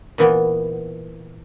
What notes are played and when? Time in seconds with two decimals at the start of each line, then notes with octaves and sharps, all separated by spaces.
0.18 A#2 E3 B3